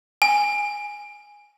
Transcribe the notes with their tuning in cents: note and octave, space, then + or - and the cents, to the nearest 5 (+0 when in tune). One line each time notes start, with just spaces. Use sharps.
G#5 -5